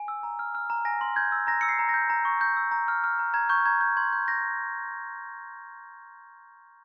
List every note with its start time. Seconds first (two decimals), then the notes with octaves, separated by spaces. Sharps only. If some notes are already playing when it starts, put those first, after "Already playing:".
Already playing: G#5
0.08 E6
0.23 A#5
0.39 F6
0.55 F6
0.70 A#5
0.85 G#5 A#6
1.01 C6
1.16 G6 G#6
1.32 E6
1.47 A#5 A#6
1.61 E6 C#7
1.69 C7
1.79 A#5
1.89 A#6
1.94 G6
2.10 A#5
2.25 C#6
2.41 G6
2.57 E6
2.71 A#5
2.88 F6
3.04 F6
3.19 A#5
3.34 A#5 G#6
3.49 C#6 G6
3.66 A#5 G#6
3.81 G6
3.97 C6 G#6
4.13 G6
4.27 G6 A#6